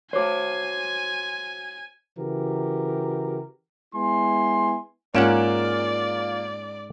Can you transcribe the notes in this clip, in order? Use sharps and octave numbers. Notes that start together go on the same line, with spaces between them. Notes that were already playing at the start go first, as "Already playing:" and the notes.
F#4 C5 C#5 G#5 D6
C#3 E3 F#4 G4 A#4
G#3 B3 E4 G#5 C6
G#2 A#3 C#4 F4 D5 F#5 D7 E7